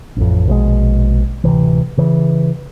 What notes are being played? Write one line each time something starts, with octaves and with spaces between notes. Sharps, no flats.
A1 F2
A#1 B2 E3 G#3
D1 D2 C3 E3
C#3 E3